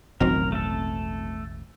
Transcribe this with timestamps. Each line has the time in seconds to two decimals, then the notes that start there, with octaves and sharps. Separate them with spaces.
0.20 E1 A1 D#3 F#3 C4 A#4
0.52 A3 A4